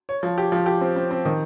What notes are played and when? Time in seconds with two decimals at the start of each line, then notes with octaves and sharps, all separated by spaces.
0.09 C#5
0.23 F3
0.38 G4
0.52 F3
0.66 G4
0.81 C4
0.96 C4
1.11 C4
1.25 D#3